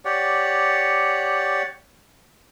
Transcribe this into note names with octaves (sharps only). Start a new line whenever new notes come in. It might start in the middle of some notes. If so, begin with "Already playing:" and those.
G4 C#5 D5 F#5